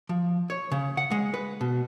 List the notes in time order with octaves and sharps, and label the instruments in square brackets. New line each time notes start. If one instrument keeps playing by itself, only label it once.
[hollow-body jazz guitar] F3
C#5
C#3
F#5
G#3
B4
B2